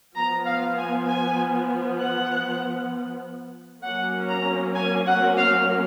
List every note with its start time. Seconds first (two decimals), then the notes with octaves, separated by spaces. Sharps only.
0.15 F3 B3 A#5
0.46 F5
0.77 G#5
1.07 G#5
2.00 F#5
3.83 F#3 A#3 C#4 F#5
4.28 A#5
4.75 G#5
5.06 F#5
5.37 F5